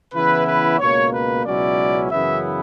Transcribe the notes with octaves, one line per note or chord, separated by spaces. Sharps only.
C#3 E3 B3 E4 B4
B4
C#2 B2 A#3 C#5
B4
C#2 B2 F#3 C#4 E4 D5
F#2 C#3 E3 B3 E4 E5